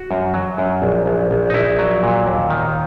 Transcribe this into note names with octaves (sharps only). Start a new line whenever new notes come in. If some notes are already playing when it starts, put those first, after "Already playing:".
Already playing: F#4
F#2
F#3
F#2
A#1
A#1
A#1
D#4
A#1 E4
F#3
A#2
D#2
D#3